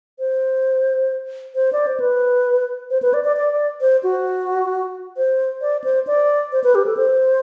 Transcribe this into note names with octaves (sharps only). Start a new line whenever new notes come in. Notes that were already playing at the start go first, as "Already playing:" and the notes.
C5
C5
D5
C5
B4
C5
B4
D5
D5
D5
C5
F#4
C5
D5
C5
D5
C5
B4
G4
A4
C5